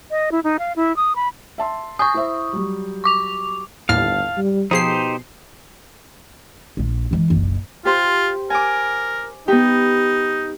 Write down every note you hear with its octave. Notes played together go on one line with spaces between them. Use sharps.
D#5
E4
D#4
F5
E4
D#6
B5
E5 A5 C6
G#5 C#6 D#6 G6
E4 C5 E5
F#3 G3
C#6 D6 F7
G1 D#2 A2 F5 A5 F6
G3
B2 F3 D#4 G4 G#4 C5 C7
A#1 F4
E3 G#3
F#1 B1
F4 G4 C5
A#4 G#5 D6
B3 D#4 G4